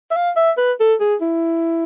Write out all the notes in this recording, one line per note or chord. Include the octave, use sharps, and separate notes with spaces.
E5
F5
E5
B4
A4
G#4
E4